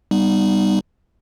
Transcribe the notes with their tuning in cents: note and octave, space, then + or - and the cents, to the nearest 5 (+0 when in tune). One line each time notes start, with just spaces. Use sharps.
G3 +0 B3 +0 D#4 -15